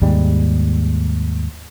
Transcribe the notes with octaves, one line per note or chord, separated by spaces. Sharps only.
D#2 G#2 G3 G#3